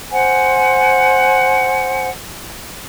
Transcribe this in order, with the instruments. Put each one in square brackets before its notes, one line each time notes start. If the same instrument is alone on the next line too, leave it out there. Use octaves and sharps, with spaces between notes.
[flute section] C5 F#5 G#5